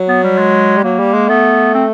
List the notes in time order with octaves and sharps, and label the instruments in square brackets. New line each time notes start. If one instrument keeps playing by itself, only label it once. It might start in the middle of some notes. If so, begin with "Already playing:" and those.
Already playing: [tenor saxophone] F#3
[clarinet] B3
G3
G#3
[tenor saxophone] G3
[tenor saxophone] F#3 [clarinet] A#3
[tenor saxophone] G3
G#3
[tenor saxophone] A3 [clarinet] B3
[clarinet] C4